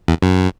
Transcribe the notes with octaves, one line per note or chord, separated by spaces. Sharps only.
E2
F#2